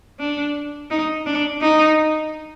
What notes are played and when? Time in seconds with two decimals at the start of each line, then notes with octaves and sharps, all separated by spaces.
0.19 D4
0.90 D#4
1.27 D4
1.62 D#4